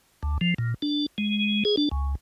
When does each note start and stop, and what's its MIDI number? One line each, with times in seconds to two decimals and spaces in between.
0.23 0.38 38
0.41 0.54 53
0.58 0.74 46
0.82 1.06 62
1.18 1.64 56
1.65 1.76 68
1.77 1.89 62
1.91 2.15 37